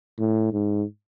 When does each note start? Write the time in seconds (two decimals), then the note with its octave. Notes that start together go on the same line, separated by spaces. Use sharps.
0.19 A2
0.53 G#2